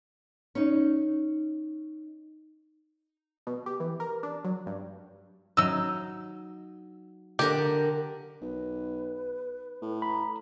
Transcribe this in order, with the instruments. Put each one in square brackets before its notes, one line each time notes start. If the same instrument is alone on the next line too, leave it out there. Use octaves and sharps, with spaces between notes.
[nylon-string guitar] C#4 D#4
[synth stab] B2
G4
E3
A#4
D4
F#3
G2
[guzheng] F#3 D#4 [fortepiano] E6
[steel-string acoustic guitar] D3 A#4 F#5 [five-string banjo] G4
[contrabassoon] B1 [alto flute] B4
[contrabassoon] A2
[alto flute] A#5 [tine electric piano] B5